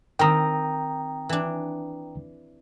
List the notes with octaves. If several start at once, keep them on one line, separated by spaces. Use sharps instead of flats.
D#3 C4 G5 A#5 D#6
E3 D4